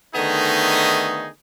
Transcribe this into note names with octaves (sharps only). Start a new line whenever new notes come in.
D3 D#3 A3 B3 D#4 G#4